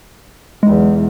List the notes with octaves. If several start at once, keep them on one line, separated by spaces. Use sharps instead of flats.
B1 E2 G#3